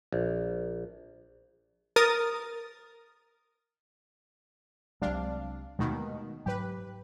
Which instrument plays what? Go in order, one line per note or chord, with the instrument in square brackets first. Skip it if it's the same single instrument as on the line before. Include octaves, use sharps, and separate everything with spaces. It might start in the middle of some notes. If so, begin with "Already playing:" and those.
[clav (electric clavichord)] A#1
[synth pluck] A#4 D#6 A6
[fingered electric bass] C2 F#3 G#3 [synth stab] C3 D4 F5
[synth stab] D#2 B2 D#3 [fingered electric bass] G#3 A3
[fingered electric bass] G#2 F#3 [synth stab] G4 B4